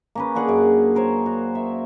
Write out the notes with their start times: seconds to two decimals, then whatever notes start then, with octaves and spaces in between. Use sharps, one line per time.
0.15 A#3 C#4 B4
0.35 A#3 D4 G#4 F#5
0.48 F#2 D6
0.95 A#4 C5 C#5
1.26 F#4
1.55 E5